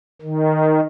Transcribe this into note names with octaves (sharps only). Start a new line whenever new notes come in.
D#3